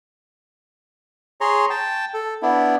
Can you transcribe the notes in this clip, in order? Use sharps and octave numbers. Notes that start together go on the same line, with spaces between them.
G#4 C#5 A#5 C6
G5 A5
A4
B3 D4 E4